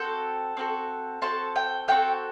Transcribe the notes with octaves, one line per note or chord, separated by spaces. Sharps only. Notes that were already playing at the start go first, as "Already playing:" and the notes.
Already playing: C4 F#4 A4 G5
C4 F#4 A4
C4 F#4 A4 A5
G5
C4 F#4 A4 G5